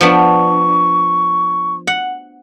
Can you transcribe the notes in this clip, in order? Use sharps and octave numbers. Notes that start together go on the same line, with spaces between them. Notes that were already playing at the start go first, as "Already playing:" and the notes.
F3 B3 D4 C#6
F#5